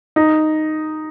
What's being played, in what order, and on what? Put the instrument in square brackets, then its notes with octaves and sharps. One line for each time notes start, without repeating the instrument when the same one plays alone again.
[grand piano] D#4